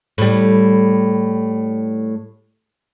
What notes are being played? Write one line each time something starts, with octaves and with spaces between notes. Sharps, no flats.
A2 G3